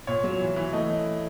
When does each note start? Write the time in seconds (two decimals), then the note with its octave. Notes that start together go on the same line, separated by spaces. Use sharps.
0.07 A#2 C#5
0.24 F#3
0.41 E3
0.56 E3
0.73 A3 D#5